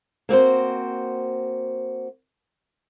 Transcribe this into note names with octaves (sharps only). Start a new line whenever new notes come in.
A#3 C4 F#4 C5